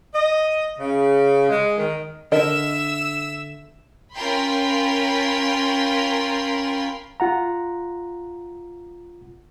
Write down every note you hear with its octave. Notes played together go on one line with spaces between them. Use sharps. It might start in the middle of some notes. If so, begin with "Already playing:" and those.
D#5
C#3
G#3
D#3
D3 A#4 D#5 E5 E6
C#4 F4 A#4 G5 B5 C6
F4 F#5 A#5